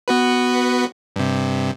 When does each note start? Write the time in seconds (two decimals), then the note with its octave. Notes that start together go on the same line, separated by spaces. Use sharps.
0.08 B3 F#4 B4
1.16 G2 C3